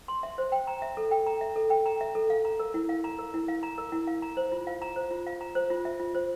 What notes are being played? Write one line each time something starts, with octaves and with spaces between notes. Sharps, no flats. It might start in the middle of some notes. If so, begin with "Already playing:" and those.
C6
E5
C5
G5
A#5
E5
A4
G5
A#5
E5
A4
G5
A#5
E5
A4
F5
A#5
A#4
E4
F5
A#5
A#4
E4
F5
A#5
A#4
E4
F5
A#5
C5
F4
F5
A#5
C5
F4
F5
A#5
C5
F4
E5
F4
C5